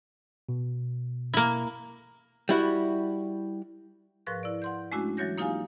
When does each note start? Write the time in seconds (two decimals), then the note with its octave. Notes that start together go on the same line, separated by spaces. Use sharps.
0.49 B2
1.34 A#3 E4
2.49 G3 E4 F#4
4.26 G#2 F3 A#4 B4 C#6 F#6
4.43 E4 D5
4.62 F#5 C6 G6
4.92 G#3 A3 C#4 D4 E4 F#4
5.17 E3 F#3 F#4 C#5 G6 A#6
5.38 A#3 D#4 F4 G4 F5 G#5